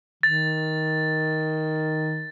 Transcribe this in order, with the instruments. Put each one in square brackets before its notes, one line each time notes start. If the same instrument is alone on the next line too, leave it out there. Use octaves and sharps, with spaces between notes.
[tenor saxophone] D#3 [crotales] A6